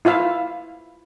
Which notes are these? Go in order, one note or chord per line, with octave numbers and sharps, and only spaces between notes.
E4 F4 E5 F5